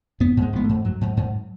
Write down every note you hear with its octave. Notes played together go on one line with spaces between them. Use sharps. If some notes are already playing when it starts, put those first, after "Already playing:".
G#2 B3
G#2
G#3
A1 B3
G#2 A3
G#2 F#3
G#2
G#2